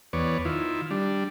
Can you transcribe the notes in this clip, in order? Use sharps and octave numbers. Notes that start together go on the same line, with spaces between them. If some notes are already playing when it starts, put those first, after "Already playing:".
E2 B3 C#5 D5
D#3 E4 F4
G3 D4